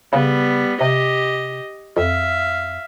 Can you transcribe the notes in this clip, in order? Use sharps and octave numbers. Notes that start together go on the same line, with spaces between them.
C#3 G3 B3
C3 G4 D#5
F2 E5 F5